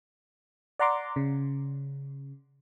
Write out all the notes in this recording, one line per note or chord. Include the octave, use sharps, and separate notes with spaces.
D5 F#5 A#5 C6 D6
C#3